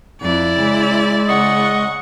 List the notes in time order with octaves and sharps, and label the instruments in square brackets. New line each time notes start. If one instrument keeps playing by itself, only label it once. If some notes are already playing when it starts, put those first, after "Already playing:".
[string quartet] F2 [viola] E4 D5
[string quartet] C#3 [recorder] G#3
[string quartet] C#3 F#5 C#6 [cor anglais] D#5